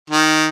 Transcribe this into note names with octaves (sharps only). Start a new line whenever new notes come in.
D#3